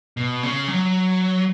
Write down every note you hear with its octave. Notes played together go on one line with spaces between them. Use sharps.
B2
C#3
F#3